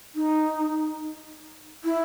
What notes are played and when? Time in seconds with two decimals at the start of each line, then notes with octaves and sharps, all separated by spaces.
0.15 D#4
1.85 E4